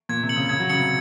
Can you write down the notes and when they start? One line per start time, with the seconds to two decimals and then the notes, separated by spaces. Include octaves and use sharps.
0.09 A#2 G#6
0.23 C3
0.29 C#7 F#7
0.36 C#3
0.49 C#3 G#6
0.59 F#3
0.70 C#3 C#7 F#7
0.79 C3